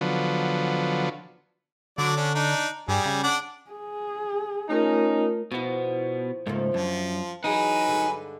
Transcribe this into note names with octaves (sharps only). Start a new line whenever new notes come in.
D3 F3 F#3 B3
D3 F#3 D4 D5
C#4 D4
D4 D#4
G2 G3 G#4
C#3
D4 D5 F#5
G#4
A3 C#4 D#4 F4 A#4
B2 F3 B3 E4
C#2 G#2 F3 A3 A#3
F#2 F3 D4
E3 F#3 D#4 G#4 B4 F#5 G#5
G2 D3 G#3